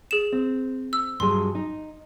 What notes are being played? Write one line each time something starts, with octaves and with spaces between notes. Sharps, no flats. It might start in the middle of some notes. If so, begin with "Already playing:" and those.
G#4 E7
C4
E6
G2 F#3 G#4 C6
D#4